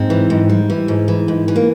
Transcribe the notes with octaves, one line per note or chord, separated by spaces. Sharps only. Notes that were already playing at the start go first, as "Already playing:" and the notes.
Already playing: G#2 C4
E3
G#2
G3
E3
G#2
E3
G#2
E3
A#3